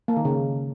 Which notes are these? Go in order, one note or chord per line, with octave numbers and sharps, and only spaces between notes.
A#3
D#3
C#3